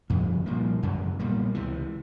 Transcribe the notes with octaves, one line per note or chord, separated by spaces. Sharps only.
G1 F2 C#3 F3
C2 A#2 F3 A#3
G#1 F#2 C#3 F#3
B1 A#2 G3 A#3
C#2 C3 E3